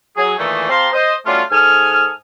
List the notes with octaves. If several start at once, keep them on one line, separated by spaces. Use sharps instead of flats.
F#3 G#4
A#2 D#3 E3 A3
C4 G4 F5 A5 A#5 C6
C5 D#5
F#3 G3 A3 C#4 D4 F4
G#2 A4 G#5 D#6 F6